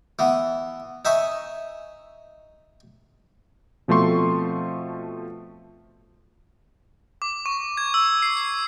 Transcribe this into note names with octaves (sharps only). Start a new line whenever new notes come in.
E3 B3
D#4 E5 G#5 C#6
B2 F3 A3 C4 C6 C#6
D6
C#6
G#6
E6
C7
C7